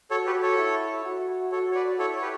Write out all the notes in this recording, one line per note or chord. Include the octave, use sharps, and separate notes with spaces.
F#4 A4 C#5
G4 B4
A4 C#5
E4
F#4
F#4 A4 C#5
C#5
B4 D5
E4 A4 C#5
C#5
G4 B4